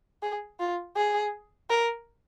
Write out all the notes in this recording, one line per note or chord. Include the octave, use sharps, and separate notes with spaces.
G#4
F4
G#4
A#4